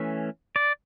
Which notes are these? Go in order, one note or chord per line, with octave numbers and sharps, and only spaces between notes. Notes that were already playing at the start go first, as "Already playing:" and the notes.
Already playing: E3 A3 C#4 E5
D5